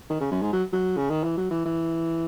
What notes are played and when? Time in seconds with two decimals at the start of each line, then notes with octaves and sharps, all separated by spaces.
0.10 D#3
0.21 C#3
0.32 F#2
0.42 G#2
0.53 F#3
0.73 F#3
0.97 C#3
1.10 D#3
1.23 E3
1.37 F#3
1.51 E3
1.65 E3